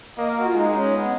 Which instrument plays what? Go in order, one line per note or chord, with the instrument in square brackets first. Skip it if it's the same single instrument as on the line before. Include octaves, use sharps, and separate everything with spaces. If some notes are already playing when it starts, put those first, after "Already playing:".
[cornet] A#3 [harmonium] D#5
[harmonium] F5
F#4
F4
[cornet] G#3 [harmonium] D#4
[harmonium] C#4
B3